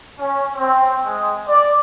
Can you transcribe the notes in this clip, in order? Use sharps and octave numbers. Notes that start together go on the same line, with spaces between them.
C#4
C4
G#3
D5